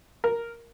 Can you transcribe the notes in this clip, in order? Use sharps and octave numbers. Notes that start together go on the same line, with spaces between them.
A#4